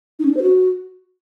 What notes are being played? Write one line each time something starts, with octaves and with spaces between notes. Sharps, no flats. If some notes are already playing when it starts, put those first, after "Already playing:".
D#4
C#4
D4
C5
F#4